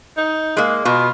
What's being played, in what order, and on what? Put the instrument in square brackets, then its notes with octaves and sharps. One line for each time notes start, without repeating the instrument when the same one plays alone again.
[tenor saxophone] D#4
[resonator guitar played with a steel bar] G#3 A#3
[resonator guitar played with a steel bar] B2 [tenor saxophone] F4